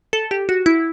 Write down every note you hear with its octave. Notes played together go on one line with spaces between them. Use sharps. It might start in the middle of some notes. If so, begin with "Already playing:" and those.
A4
G4
F#4
E4